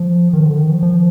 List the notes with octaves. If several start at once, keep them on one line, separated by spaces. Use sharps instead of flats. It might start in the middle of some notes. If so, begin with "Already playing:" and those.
Already playing: F3
D#3
D3
D#3
F3
F3